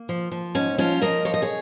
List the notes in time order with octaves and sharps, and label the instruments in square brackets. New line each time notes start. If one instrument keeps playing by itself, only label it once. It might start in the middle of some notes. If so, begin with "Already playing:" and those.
Already playing: [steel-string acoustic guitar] A#3
F3
F3
G#2 C#4
F3 C#4 F4
F3 A#4 D#5
F3 C#5
D#5
G#4 C#5